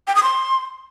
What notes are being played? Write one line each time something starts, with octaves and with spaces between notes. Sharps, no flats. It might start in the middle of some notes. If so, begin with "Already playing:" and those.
G5
D#6
C6